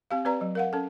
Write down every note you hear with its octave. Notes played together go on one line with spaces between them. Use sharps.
C4 G4 F5
C4 G4 B4 D5 A#5
F#3
A#4 F5 F#5
C#4 A4